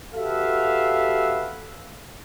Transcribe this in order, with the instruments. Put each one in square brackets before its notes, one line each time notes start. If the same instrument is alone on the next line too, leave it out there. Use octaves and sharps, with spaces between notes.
[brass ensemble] F#4 G4 A4 B4 E5 F5